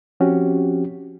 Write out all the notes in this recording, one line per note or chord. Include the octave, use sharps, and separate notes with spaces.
F3 C4 C#4 F#4 G4